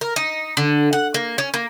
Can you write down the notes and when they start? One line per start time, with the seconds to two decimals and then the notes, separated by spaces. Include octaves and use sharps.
0.01 A#4
0.16 D#4
0.57 D3
0.93 F#5
1.14 A#3
1.38 C#4
1.54 A#3